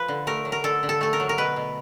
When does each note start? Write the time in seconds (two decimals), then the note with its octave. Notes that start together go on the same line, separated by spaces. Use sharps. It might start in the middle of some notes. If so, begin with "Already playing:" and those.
Already playing: F3 B4
0.08 D3
0.27 A3 A#4
0.45 F#3
0.52 A#4
0.64 D3 A4
0.83 D3
0.89 A4
1.01 A3 A4
1.13 A#4
1.20 F#3
1.29 A#4
1.38 B2 B4
1.56 B2